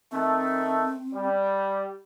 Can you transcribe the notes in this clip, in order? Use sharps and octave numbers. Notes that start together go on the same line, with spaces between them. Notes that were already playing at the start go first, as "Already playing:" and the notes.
D#3 A3 C4
G3